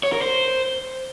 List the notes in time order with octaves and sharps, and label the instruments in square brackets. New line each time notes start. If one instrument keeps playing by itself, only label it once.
[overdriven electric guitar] C#5
A#4
C5